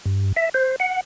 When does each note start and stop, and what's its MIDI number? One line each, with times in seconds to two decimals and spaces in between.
0.06 0.32 43
0.36 0.49 76
0.54 0.76 72
0.80 1.01 78